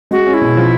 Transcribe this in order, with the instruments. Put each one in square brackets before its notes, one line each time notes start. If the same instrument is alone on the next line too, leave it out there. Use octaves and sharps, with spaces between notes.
[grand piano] G#3 [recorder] F#4
[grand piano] C#4
[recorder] E4
[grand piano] B2
F3